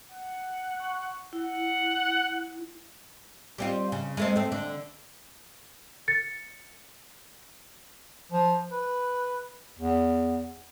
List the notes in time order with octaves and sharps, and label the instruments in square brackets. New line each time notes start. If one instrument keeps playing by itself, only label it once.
[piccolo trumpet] F#5
[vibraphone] C#6
[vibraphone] E4 [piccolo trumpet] F#5
[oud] G3 C4 F4
C#3
G#3 A3 C4
A3 C4
D3
[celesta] A6 C#7
[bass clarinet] F3
B4
E2